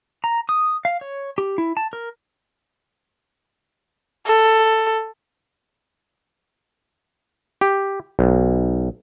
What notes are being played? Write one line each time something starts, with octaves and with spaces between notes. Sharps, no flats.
A#5
D#6
F5
C#5
G4
E4
A5
A#4
A4
G4
B1